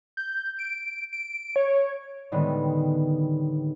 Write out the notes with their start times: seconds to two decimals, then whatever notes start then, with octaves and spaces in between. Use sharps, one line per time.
0.17 G6
0.59 D7
1.13 D7
1.56 C#5
2.32 A2 D3 D#3 G3 G#3 B3